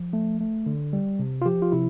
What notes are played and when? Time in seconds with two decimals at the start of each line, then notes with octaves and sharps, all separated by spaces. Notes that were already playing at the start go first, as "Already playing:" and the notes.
Already playing: F3
0.13 A3
0.40 A3
0.66 D3
0.93 G3
1.19 C3
1.42 F4
1.46 F3 G4
1.62 F4
1.72 C3 E4